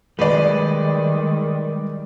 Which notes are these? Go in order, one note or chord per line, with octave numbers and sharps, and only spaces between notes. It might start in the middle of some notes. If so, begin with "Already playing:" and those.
D#3 G3 G#3 B4 D5